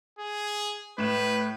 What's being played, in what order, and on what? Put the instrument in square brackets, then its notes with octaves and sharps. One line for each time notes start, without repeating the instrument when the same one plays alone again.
[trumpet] G#4
[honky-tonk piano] A2 E7 [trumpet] B4